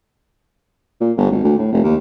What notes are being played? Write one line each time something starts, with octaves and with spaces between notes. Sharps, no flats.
A#2
G1
G#1
D2
A2
F1
D#2